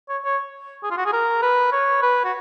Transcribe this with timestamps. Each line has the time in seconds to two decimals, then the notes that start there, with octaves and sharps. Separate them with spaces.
0.09 C#5
0.24 C#5
0.84 G#4
0.91 F4
0.98 F#4
1.06 G#4
1.13 A#4
1.42 B4
1.72 C#5
2.03 B4
2.25 F#4